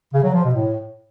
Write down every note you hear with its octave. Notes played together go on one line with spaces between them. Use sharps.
C#3
F#3
F3
B2
A2